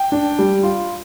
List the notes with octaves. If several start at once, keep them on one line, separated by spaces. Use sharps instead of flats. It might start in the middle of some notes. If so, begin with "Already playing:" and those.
Already playing: G5
D4
G3
F4